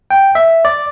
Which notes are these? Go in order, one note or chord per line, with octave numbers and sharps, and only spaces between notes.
G5
E5
D5